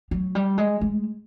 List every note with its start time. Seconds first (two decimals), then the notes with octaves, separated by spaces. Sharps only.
0.11 F#3
0.35 G3
0.58 G#3
0.81 G#3